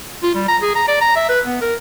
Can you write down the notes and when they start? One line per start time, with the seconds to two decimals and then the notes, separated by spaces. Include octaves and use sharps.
0.23 F4
0.35 G3
0.49 A#5
0.62 G#4
0.75 A#5
0.88 D5
1.01 A#5
1.16 E5
1.29 B4
1.46 B3
1.61 A#4